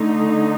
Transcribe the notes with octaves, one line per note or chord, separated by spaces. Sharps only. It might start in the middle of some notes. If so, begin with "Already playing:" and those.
Already playing: D3 A3 D#4